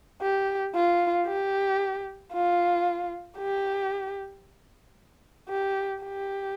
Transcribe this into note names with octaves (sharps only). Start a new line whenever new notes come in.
G4
F4
G4
F4
G4
G4
G4